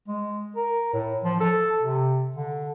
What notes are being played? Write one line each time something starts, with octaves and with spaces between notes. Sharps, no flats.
G#3
A#4
A2
F3
A4
C3
D3